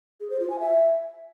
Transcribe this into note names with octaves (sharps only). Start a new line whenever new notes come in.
G#4
C5
F4
G#5
E5